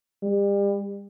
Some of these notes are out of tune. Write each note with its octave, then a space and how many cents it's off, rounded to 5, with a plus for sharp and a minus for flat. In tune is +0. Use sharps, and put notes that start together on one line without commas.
G3 +35